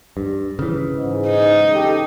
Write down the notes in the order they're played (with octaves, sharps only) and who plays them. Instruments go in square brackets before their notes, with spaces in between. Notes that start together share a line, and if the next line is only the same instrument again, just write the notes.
[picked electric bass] G2
C#3 E3
[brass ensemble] G#2
[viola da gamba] D#4
[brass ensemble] G4 A4